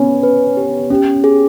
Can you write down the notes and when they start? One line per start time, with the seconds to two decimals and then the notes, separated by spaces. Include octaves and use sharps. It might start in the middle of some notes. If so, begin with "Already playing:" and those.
Already playing: B3 C#4
0.23 B4
0.57 G4
0.90 C#4 G4
1.24 G#4